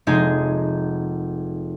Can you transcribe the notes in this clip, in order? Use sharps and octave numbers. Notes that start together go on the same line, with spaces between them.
F1 G#3 D#4 G#4 A#6